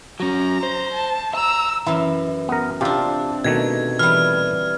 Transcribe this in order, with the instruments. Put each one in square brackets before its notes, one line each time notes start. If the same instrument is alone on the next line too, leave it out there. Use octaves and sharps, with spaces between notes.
[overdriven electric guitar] F#3 C#4 [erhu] A#5
[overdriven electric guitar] C5
[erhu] A5
[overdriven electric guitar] A5 A#5 [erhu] E6
[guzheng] F#2 E3 [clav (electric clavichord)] E4
[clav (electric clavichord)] B3 A#4
[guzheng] C3 D4 [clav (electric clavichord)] F4 G4
[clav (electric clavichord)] B2 D#3 A3 [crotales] G#6
[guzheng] E3 G3 [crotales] F6